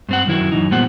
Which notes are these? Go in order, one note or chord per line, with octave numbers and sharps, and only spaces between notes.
G2 C4 F#5
F#2 D#3 E4 F#4
F#2 C3 E3 D#4
A#2 G3 B3 C5 F#5